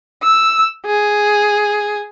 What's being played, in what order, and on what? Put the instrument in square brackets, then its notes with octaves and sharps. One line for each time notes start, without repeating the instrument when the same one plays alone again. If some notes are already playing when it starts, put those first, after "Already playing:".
[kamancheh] E6
G#4